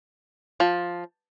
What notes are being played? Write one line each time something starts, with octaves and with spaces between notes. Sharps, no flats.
F3